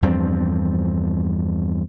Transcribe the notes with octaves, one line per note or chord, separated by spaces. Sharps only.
E2 G2 F3 C4